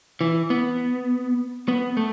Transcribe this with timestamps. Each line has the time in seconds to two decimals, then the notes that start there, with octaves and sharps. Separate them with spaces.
0.21 E3
0.50 B3
1.68 B3
1.97 A3